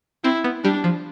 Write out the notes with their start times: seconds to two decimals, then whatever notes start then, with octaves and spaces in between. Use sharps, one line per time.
0.24 C4 E4
0.44 B3
0.64 G3 D4
0.84 F3